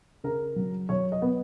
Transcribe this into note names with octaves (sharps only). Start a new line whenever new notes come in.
C#3 A#4
F#3
F#3 C#5
D#5
B3